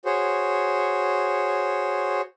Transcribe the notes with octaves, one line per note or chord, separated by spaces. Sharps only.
F#4 G#4 C5 C#5